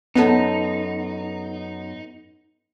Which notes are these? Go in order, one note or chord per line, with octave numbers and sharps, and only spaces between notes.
F#2 B3 D#4 A4